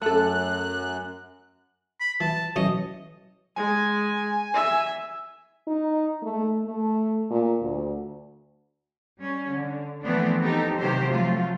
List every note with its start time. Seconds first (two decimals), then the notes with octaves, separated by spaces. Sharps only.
0.02 F#2 A3 A4 F#6
2.00 B5
2.20 E3 A5
2.56 B1 E3 C#4 D#5
3.56 G#3 G#5
4.54 E5
5.68 D#4
6.23 A3
6.65 A3
7.31 A#2
7.62 D2
9.20 G3 C#4
9.51 D3
10.04 E3 F3 A3 B3 C4 D4
10.42 C4 D#4 G4 A4
10.79 C3 D#3 E3 F#3 G4 C5
11.10 F3 F#3 A3 F4